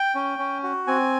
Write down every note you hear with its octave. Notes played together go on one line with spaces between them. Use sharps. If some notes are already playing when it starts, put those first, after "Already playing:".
Already playing: G5
C#4
C#4
F#4
C4 G#5